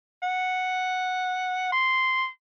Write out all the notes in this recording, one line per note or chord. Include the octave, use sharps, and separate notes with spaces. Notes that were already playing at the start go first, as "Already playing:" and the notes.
F#5
C6